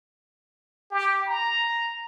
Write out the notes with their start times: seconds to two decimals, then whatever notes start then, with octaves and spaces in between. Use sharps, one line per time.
0.90 G4
1.27 A#5